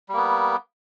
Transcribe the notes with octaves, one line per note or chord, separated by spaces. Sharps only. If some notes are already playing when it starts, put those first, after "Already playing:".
G3 A#3 B3